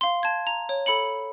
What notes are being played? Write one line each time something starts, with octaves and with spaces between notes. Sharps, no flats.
F5 C6
A5 G#6
A#5
C#5
A4 B5 C#7 F#7